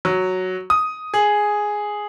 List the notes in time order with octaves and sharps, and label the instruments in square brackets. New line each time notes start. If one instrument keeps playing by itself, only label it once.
[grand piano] F#3
D#6
G#4